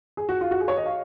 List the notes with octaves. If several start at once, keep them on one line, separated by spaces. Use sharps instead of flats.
G#4
F#4
F4
F#4
G#4
C#5
D#5
F5